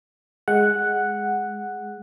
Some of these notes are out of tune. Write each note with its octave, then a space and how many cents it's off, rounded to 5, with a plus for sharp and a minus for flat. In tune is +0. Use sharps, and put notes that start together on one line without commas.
G#3 +0 F#5 +0